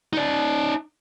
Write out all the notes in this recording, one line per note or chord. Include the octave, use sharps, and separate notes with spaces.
D#4 D5